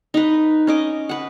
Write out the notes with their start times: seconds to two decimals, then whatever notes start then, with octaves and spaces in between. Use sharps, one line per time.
0.14 D#4 B4
0.67 C#4 D#5 D6
1.09 B4 F#5